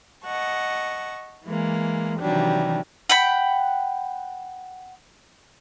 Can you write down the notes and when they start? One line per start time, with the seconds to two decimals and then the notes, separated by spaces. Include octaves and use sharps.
0.24 D#5 F#5 A5 C#6
1.45 E3 G#3 A#3
2.20 C3 D#3 E3 F#3 G3 D4
3.09 F#5 G5 B5